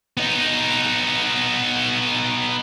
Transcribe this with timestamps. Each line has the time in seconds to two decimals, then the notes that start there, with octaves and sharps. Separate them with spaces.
0.17 B3 D#4